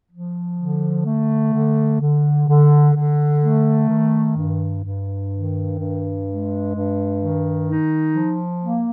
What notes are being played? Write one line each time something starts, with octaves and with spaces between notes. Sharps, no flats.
F3
D3
A3
D3
D3
D3
D3
A3
D#3
G2
G2
D#3
G2
G#3
G2
D#3
D#4
F3
A#3